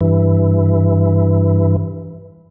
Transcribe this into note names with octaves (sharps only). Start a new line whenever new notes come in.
G2 E3